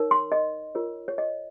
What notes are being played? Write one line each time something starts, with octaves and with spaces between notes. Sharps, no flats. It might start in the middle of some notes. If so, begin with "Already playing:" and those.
Already playing: D#4 A#4 C#5
C6
D#5
F4 A#4 C#5
C#5
D#5